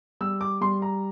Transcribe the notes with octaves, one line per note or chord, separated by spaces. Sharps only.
G3 E6
D6
G3 C6
A#5